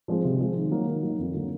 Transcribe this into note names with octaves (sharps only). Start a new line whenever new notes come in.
F3 G#3 C4
C3
F3 G#3 C4
D#3
F#3 A#3 D#4
D#3
F#3 A#3 D#4
F2
D3 F#3 A#3